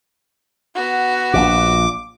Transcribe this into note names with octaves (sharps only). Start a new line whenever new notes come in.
B3 F#4
A#1 A#2 D6